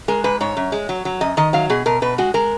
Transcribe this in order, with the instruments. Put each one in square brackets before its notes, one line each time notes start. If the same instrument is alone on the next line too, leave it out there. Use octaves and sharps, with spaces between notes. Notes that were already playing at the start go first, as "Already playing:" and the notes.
[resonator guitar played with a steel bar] G#3 A#4
G#2 B4
G#2 C#5
F#2
G#3
F#3
F#3
F#2 D#5
D#3 D#5
F#3 F5
B2 G#4
B2 A#4
B2 B4
G#3 F#4
G#3 A#4